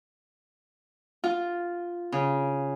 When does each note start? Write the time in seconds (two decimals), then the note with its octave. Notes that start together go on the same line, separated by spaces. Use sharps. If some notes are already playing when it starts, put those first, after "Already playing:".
1.24 F4
2.12 C#3